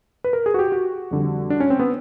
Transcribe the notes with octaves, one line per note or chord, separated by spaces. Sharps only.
B4
A#4
G#4
F#4
G4
F#4
F2 D3 G3
D4
C#4
C4
B3